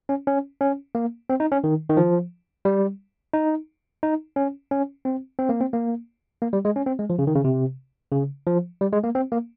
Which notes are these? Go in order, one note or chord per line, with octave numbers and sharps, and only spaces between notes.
C#4
C#4
C#4
A#3
C4
D#4
C#4
D#3
D#3
F3
G3
D#4
D#4
C#4
C#4
C4
C4
A#3
C4
A#3
A#3
G3
G#3
C#4
C4
G#3
F3
C#3
D#3
C#3
C3
C#3
F3
G3
G#3
A#3
C4
A#3